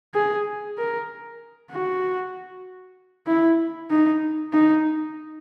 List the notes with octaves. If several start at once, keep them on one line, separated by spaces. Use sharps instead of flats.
G#4
A#4
F#4
E4
D#4
D#4